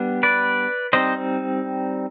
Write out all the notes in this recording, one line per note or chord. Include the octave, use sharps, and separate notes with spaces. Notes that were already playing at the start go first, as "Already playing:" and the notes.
Already playing: G3 B3 D4
B4 D5
G3 C4 D#4 C5 D#5